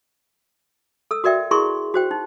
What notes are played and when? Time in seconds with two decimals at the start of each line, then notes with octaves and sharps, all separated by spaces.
1.11 A4 E6
1.24 F#4 A#4 D5 E5 G5
1.51 E4 G#4 A#4 C6 C#6
1.94 F#4 C5 G5
2.11 D#4